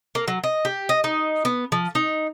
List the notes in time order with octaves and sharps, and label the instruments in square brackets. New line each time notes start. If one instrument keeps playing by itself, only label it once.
[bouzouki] A#3
F#3
D#5
G4
D#5
D#4
B3
F3
D#4